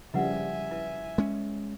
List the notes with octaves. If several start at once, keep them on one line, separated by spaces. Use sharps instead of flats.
C#3 F3 G3 E4 B4 E5 F#5 G#5
E4 B4
G#3 C#4